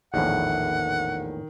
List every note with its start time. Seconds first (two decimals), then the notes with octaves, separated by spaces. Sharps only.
0.14 A#1 E2 A2 D#3 F#5